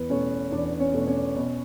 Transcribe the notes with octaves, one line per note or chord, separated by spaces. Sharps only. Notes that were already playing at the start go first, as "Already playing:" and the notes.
Already playing: E2 B3 B4
B2 A3 C#4 C#5
E2 D4 D5
C#4 C#5
B2 A3
C#4 C#5
B2